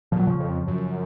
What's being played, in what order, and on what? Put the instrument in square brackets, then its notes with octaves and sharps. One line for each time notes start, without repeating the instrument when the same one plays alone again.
[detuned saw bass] A#2 [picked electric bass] F3
[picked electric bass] F#3
C#3 F3
[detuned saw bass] F2
F#2